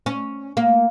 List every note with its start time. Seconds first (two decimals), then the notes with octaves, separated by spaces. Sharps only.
0.06 C#4
0.57 A#3